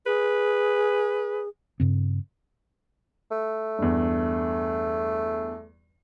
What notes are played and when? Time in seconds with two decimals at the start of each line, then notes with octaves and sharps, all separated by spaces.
0.06 G#4 B4
1.80 G2 C#3 C4
3.31 A3
3.79 E2 G2